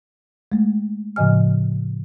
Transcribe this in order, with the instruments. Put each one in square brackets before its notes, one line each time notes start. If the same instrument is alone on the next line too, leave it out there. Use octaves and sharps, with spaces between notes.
[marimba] G#3 A3
A2 C#3 F3 D#5 G#5 F6